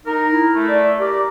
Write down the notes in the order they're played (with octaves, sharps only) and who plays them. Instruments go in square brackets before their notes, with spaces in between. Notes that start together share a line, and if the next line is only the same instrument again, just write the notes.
[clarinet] D#4 [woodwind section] A#4
[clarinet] E4
[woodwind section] A3
[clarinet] D5
[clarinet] G4 [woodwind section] A#4 D5